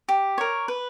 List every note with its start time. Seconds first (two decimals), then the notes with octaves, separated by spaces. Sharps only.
0.08 G4
0.38 A#4 C#5
0.68 B4